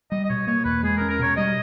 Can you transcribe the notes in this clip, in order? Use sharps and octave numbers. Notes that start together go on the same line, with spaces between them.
G3 D#5
D#5
B2 C#5
A#3 C#5
E2 B4
G#3 G#4
A#4
C#4
A#4
B2 C#5
G3 D#5